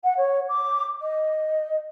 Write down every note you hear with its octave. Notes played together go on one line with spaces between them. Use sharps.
F#5
C#5
D6
D#5